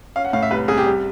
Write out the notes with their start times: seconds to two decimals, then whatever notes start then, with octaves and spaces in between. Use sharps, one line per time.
0.16 C#4 F5
0.25 F#5
0.33 A2 F5
0.43 E5
0.51 C2 B4
0.68 C2 G#4
0.77 G4
0.86 G3